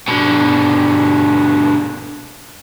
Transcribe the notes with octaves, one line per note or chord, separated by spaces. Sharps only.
B2 D3